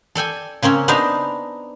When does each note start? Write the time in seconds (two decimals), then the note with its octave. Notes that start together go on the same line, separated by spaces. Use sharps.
0.15 A4 D5 G5 G#5
0.62 C#3 A#3 C4 C#4
0.88 B3 D4 D#4 C5 D5 A#5